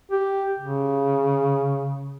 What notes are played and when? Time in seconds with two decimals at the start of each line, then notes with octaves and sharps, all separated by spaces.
0.12 G4
0.60 C#3